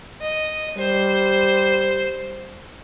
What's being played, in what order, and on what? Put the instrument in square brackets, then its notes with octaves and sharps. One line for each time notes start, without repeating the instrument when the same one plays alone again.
[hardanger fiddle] D#5
[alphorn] G3 [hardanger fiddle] C5